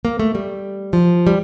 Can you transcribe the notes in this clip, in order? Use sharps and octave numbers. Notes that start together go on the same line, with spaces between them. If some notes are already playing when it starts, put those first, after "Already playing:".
A#3
A3
G3
F3
G3